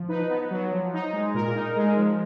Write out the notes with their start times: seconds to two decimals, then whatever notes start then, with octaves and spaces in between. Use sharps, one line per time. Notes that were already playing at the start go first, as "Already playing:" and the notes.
Already playing: F3
0.08 D#4 B4
0.29 B3
0.51 F#3
0.72 F3
0.93 D#4
1.13 G#3
1.34 A#2 A#4
1.55 D#4
1.76 G#3
1.97 F3